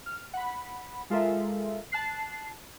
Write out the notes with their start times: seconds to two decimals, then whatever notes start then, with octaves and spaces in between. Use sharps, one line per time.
0.06 F6
0.34 F#5 B5
1.10 G#3 F4 A4 A#4 E5
1.92 A5 F#6 C7